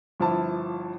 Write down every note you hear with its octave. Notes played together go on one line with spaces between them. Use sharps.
G1 F3 E4 A5